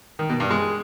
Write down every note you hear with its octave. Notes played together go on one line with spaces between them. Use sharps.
D#3
B2
G2
G#3